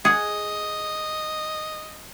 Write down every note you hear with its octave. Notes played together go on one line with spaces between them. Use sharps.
G#4 D#5 F#5